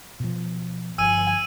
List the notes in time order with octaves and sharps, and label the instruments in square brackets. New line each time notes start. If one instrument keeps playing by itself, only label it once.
[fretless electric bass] B2 F3
[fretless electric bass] G1 F3 [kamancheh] G#5 [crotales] E6 D#7